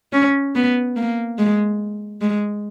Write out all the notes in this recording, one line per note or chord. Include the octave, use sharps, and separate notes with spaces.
C#4
B3
A#3
G#3
G#3